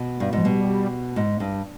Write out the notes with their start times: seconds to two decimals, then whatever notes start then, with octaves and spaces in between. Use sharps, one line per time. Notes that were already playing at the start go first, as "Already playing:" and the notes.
Already playing: B2
0.20 G2
0.33 G#2 F3
0.45 B2 G3
1.16 G#2
1.40 G2